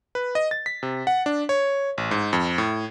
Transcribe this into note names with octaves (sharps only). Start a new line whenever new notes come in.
B4
D#5
A6
B6
C3
F#5
D4
C#5
A1
G#2
F2
A2